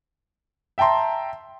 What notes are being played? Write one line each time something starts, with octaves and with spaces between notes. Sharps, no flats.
E5 G5 A5 A#5 C6